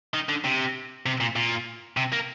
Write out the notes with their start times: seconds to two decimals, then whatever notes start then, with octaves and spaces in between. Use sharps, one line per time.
0.14 D#3
0.29 D3
0.44 C3
1.06 C3
1.20 A#2
1.36 A#2
1.97 C3
2.13 A#3